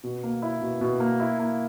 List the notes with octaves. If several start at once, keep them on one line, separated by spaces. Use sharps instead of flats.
B2
A#3
E4
B2
B2
A#3
E4
A#3